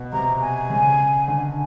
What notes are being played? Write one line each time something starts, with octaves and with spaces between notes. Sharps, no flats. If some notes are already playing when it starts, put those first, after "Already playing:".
Already playing: B2
C3 A#5
G#5
C#3
D3